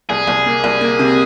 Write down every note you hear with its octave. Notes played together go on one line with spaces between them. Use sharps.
C2 G#4
C2
A#3
C2
A#3
C3